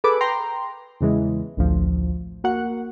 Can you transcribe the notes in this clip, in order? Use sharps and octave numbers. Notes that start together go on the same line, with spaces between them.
G#4 A4 B4 B5 D6
G5 A#5 C6
E2 C#3 E3 G#3
A1 D2 F3
A#3 F#4 F#5